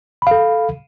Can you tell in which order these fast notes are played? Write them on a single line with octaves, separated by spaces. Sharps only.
B5 F5 A4